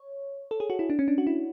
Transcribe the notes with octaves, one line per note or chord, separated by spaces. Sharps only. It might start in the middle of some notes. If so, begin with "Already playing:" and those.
Already playing: C#5
A4
G#4
F#4
E4
D4
C#4
D4
F#4
E4